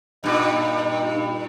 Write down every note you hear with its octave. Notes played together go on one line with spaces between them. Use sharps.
G2 A#2 D#4